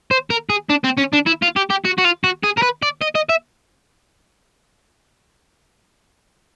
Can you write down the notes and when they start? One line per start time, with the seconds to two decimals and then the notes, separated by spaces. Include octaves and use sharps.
0.11 C5
0.30 A#4
0.50 G#4
0.70 D4
0.84 C4
0.98 C#4
1.13 D4
1.27 E4
1.42 F4
1.56 G4
1.70 G4
1.85 F#4
1.98 F#4
2.05 F4
2.24 F#4
2.43 G#4
2.57 A#4
2.62 B4
2.82 D5
3.02 D#5
3.15 D#5
3.30 E5